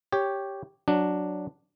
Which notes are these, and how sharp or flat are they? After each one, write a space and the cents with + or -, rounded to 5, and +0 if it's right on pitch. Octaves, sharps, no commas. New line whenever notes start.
G4 +0 C#5 +0
F#3 +0 D4 +0